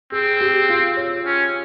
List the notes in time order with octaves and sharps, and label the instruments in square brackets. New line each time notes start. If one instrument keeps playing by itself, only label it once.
[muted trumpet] C4 [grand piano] G#4
[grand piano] G4
F4
C#5
[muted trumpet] C#4